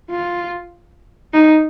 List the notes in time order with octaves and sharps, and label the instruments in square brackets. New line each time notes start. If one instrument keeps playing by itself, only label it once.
[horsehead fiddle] F4
D#4